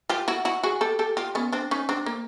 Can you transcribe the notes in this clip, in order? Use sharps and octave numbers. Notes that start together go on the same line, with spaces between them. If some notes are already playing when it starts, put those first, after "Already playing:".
F4 G4
E4 F#4
E4 F#4
F#4 G#4
G4 A4
G4 A4
F4 G4
B3 C#4
C4 D4
C#4 D#4
C4 D4
A#3